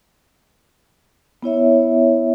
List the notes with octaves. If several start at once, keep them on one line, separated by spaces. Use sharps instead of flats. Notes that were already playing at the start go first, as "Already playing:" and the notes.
B3 E4 C#5 E5